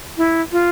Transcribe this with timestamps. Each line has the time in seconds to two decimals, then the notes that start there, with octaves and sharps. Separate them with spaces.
0.17 E4
0.52 F4